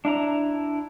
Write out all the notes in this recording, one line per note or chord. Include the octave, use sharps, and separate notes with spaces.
D4 E4 A#5